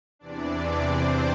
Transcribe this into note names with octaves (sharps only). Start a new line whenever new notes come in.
E2 C3 E3 D4 D5
C4 C5